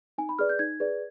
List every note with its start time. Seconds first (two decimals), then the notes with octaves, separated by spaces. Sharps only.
0.18 D#4 G#5
0.29 B5
0.39 G#4 B4 D5 F6
0.49 G6
0.59 D#4 G#6
0.80 G#4 B4 D5